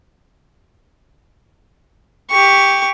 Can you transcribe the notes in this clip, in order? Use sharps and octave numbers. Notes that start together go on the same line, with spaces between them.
G4 C#6